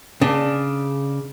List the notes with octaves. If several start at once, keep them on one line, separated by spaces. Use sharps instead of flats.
C#3 D4